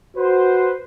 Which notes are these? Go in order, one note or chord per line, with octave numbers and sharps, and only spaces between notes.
F#4 B4 C5